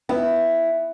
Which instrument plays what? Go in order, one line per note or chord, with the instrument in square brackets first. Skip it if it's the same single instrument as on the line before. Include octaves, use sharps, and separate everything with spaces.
[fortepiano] B3 [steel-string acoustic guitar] E4